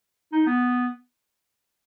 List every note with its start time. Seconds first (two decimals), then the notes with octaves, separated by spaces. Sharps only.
0.32 D#4
0.47 B3